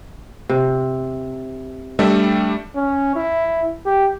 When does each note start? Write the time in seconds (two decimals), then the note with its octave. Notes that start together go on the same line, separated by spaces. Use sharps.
0.49 C3
1.99 G3 A3 D4 E5
2.75 C#4
3.16 E4
3.86 G4